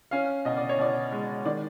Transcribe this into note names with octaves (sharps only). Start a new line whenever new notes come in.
C#4 F5
B2 D#5
D5
C#5
B2 D5
G#3
D#3 D5